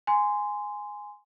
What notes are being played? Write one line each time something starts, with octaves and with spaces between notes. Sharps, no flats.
G#5 C6